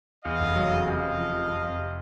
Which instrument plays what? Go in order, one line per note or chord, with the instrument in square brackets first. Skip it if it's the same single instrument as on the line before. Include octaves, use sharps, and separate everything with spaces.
[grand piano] E2 [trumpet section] D#5 F5
[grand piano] F1
F#3
C#3
[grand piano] C3 [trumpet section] D#5 F5
[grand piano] C3
F3
C3
F2
F2
C3